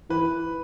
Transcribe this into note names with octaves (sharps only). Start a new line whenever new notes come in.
E3 B4